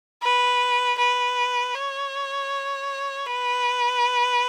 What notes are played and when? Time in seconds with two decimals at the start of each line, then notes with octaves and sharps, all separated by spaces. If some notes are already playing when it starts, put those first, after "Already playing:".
0.23 B4
0.98 B4
1.74 C#5
3.26 B4